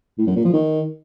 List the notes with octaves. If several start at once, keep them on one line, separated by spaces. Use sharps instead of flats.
A2
F#2
A#2
F3
D#3